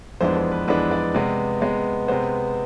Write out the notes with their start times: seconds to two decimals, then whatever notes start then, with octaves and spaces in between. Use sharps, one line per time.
0.21 F2 E3 G#3 B3 D4 C5
0.37 C5
0.52 B4
0.68 F2 E3 G#3 B3 D4 B4
0.91 D5
1.15 C3 G#3 B3
1.61 C3 G#3 B3
2.08 C3 G#3 B3 C5